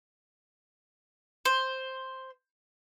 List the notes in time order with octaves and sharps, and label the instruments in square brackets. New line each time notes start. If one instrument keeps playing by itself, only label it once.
[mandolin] C5